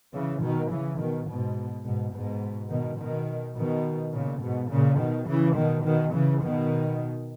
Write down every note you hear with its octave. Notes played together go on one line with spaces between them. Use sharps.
C#3 E3
B2 D#3
C#3 E3
B2 D#3
G#2 B2
G#2 B2
G#2 B2
B2 D#3
B2 D#3
B2 D#3
A#2 C#3
G#2 B2
A#2 C#3
B2 D#3
C#3 E3
B2 D#3
B2 D#3
C#3 E3
B2 D#3